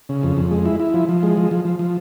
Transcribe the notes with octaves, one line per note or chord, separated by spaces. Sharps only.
C#3
F2
F2
G#3
E4
E4
F3
F3
G#3
F3
F3
F3
F3